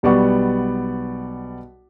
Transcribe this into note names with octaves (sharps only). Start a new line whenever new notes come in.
B1 G3 B3 D5 F#5 C#6